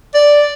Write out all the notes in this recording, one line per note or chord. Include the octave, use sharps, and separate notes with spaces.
D5